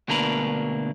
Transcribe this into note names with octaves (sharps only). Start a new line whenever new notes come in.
D2 B2 A#3 D4 A#4 B4